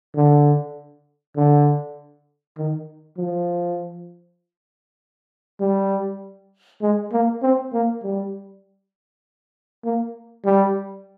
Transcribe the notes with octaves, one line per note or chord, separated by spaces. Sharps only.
D3
D3
D#3
F3
G3
G#3
A#3
C4
A#3
G3
A#3
G3